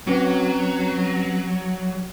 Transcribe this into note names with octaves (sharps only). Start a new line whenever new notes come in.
F#3 C4 C#4 B4